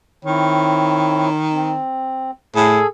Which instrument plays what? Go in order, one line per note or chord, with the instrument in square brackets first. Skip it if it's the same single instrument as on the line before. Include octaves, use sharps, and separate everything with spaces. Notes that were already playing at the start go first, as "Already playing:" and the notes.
[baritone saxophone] D#3 [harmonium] C4 E4 C#5
[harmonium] C4
[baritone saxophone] A2 [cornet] G#4 [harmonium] A4